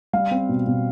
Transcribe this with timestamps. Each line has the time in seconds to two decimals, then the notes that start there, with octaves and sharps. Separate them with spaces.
0.13 G3 F5
0.31 C4
0.49 B2
0.67 B2